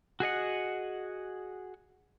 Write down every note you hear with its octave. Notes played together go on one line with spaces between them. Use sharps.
F#4 G#4 D#5 F#5